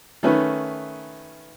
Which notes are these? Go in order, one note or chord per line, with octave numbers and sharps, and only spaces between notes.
D#3 A3 C#4 B4